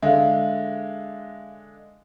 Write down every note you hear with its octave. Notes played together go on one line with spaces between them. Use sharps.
D3 G#3 E5 F5